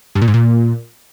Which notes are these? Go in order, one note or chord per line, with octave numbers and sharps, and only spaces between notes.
G2
A#2
G#2
A#2